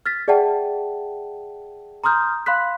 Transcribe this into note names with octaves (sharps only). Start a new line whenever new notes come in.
F6 A6 B6
G#4 D5 E5 F#5 G5 A5
A#5 C6 D#6 F6 G6
F5 B5 C6 F#6 B6